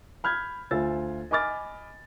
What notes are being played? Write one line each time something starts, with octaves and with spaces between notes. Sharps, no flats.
B5 F6 G6 G#6
D2 F4 C5 G#5 E6 A6
D#5 G#5 B5 D6 F6 A6